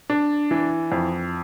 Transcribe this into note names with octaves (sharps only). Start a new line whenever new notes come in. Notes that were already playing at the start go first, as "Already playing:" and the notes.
D4
E3
F2